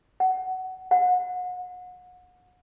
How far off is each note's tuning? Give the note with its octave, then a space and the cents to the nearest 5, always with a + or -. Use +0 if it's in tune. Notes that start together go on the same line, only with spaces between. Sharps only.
F#5 +15
F#5 -35